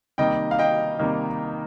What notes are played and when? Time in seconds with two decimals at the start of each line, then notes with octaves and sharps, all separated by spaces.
0.18 C3 D#3 G3 A#3 D#4 D#5 G5
0.51 F5
0.59 D#5 G5
0.99 C3 D#3 G3 A#3 D#4